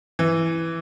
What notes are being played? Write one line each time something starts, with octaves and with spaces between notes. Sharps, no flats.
E3